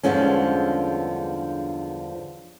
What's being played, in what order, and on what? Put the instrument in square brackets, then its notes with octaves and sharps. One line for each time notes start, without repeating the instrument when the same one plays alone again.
[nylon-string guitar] E2 G2 D3 F3 G#3 C#4